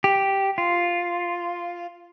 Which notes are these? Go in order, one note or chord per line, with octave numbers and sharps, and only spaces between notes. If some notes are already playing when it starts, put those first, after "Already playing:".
G4
F4